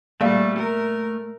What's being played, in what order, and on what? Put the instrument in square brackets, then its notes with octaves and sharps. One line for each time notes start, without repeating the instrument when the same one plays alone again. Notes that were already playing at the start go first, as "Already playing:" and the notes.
[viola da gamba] A#2 G3 [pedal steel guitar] A3 [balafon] A#3 D5 F5
[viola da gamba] A#4